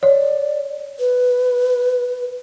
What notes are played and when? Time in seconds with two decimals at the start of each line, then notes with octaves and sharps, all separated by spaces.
0.03 C#5 D5
0.99 B4